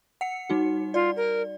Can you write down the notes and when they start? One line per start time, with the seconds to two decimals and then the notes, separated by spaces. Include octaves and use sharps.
0.21 F#5 C#7
0.50 G3 D#4 F#4
0.94 F4 D5
1.17 A#4